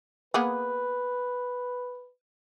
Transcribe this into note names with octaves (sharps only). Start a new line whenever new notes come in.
A#3 B3 G#4 B4